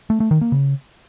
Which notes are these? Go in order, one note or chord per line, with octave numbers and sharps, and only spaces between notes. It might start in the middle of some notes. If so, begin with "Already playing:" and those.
A3
A3
D#3
A#3
C#3